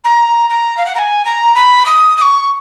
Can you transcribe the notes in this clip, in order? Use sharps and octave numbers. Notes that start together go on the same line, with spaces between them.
A#5
A#5
F5
F#5
A#5
G#5
A#5
B5
D#6
D#6
C#6